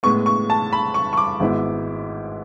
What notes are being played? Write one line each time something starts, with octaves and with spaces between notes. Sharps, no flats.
A2 G#3 B3 C#6
C#6
A5
B5
C#6
C#6
D6
G#1 G#2 G#3 B3 E4